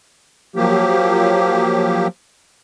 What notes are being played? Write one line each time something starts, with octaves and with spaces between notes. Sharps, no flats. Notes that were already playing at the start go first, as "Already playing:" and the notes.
F3 F#3 A#3 G4